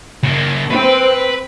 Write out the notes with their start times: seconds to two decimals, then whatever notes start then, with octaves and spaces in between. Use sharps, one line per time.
0.23 C#3 A#3
0.70 C4 B4